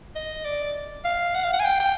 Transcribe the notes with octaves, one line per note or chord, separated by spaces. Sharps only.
D#5
D5
F5
F#5
F5
F#5
G#5
G5
G5